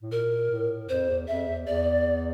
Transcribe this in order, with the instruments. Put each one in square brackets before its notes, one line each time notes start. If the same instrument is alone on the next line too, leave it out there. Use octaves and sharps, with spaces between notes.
[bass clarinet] A2
[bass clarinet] A#2 [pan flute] A#4
[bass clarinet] A2
[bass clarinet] F2 [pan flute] C5
[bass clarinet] E2
[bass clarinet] F2 [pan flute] E5
[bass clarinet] E2
[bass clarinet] E2 [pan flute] D5